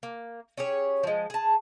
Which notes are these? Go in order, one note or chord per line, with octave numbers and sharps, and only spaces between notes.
A#3
C#4 G4 G#4 C#5
F3 G#3
G#4 A5